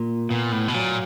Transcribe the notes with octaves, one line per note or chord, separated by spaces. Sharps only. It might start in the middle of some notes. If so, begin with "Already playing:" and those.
Already playing: A#2
A#2 B3
A2
B2
A#2 F#3